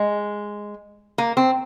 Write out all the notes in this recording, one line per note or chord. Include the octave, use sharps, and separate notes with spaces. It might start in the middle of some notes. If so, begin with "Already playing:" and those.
Already playing: G#3
A#3
C4